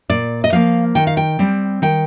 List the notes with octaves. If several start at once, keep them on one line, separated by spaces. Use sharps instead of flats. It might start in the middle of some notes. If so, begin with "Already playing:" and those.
A#2 D5
D#5
F3 A#3 F5
D#3 G5
F5
G5
G3 C4
D#3 G5